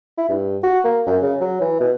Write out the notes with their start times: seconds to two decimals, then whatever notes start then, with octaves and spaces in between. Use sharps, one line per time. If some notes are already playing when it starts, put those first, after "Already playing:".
0.18 E4
0.29 G2
0.63 F#4
0.84 A#3
1.07 F#2
1.22 C#3
1.40 F#3
1.61 E3
1.80 B2